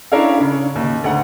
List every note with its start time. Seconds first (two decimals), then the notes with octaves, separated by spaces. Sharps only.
0.12 C#4 D4 E4 A#4 C#5 F5
0.40 C#3
0.75 D#2
1.04 D2 F#5